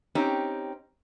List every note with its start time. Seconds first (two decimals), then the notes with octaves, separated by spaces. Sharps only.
0.15 C4 C#4 D#4 G4